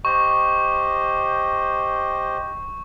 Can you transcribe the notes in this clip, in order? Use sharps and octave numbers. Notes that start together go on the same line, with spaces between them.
G4 C5 D#5 C#6